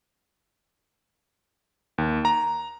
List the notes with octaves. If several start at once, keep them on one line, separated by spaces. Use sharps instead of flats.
D#2
A#5